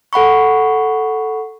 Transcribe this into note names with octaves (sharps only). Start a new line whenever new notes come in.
A4 F#5 B5 C#6